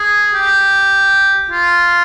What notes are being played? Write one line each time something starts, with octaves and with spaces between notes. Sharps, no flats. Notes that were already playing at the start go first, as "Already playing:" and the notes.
Already playing: G#4
G4
F4